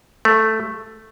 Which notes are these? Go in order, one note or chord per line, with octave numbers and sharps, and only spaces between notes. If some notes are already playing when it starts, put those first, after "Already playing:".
A3